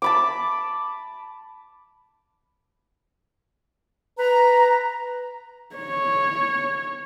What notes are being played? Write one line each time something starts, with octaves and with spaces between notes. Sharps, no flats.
A5 B5 D6
B4 A#5
C#5